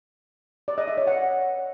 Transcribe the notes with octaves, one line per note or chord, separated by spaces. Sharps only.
D5
D#5
E5
C#5
F#5